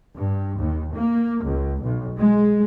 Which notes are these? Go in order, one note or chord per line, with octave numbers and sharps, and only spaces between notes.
G2
D#2
A#3
C#2
B1
G#3